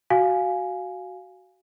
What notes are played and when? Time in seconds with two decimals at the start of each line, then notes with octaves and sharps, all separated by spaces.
0.10 F#4 F5 G#5